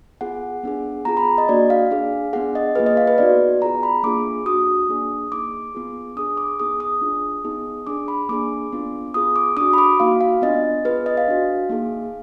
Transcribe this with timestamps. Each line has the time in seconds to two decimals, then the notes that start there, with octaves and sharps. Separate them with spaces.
0.21 B3 F4 G#4 F#5
0.63 B3 D4 G#4
1.05 B3 F4 G#4 A#5
1.17 B5
1.38 D#5
1.49 A#3 D4 F#4 D5
1.70 F5
1.91 D4 G#4
2.33 B3 D4 G#4 F#5
2.55 D#5
2.75 A#3 F4 G#4 B4
2.86 D#5
2.97 F5
3.07 B4
3.18 B3 D#4 F#4 D5
3.61 B3 F4 G#4 A#5
3.83 B5
4.03 A#3 D4 F4 G#4 D6
4.46 D4 F#4 D#6
4.89 A#3 D4 G#4
5.31 A#3 D#4 G#4 D6
5.75 B3 F4 G#4
6.16 D4 G#4 D#6
6.37 D6
6.59 B3 D#4 G#4 D#6
6.80 D#6
7.02 D4 F4 G#4
7.44 B3 D#4 G#4
7.87 D4 G#4 D6
8.08 B5
8.29 A#3 D4 G#4 D6
8.72 B3 D4 F4
9.14 B3 F4 G#4 D#6
9.36 D6
9.57 D4 F#4 D#6
9.73 B5
9.78 D6
10.00 A#3 D#4 F#4 F5
10.21 F5
10.42 B3 D4 F4 D#5
10.85 B3 F4 G#4 B4
11.06 D#5
11.17 F5
11.28 D4 F#4
11.70 A#3 D#4 G#4